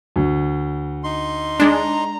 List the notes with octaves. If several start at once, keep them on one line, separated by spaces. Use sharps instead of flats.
D2
D#4 C6
G#3 D4 A#5